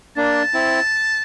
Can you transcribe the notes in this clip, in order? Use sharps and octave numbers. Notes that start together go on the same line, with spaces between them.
A#3 D4 A5
C4 E4